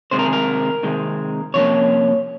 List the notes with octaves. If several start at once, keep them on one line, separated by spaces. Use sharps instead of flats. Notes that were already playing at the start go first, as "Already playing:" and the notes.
C3 D#3 G#3 C4 C5
A#4
G#4
A#4
C3 D#3 G#3 C4
C3 F3 A#3 C#4 C#5